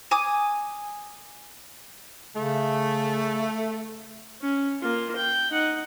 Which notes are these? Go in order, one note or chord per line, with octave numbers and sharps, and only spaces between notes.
G#5 D6 D#6
C#3 A3
C#4
A#3 F4
G5
D#4 F#5